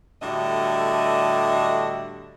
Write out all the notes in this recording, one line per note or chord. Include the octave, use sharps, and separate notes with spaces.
A2 D3 G3 F#4 D#5 E5